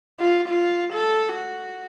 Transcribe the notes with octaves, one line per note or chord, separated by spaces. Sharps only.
F4
F4
A4
F#4